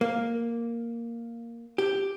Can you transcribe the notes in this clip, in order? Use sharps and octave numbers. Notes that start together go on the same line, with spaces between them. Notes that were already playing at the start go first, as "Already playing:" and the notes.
A#3
G4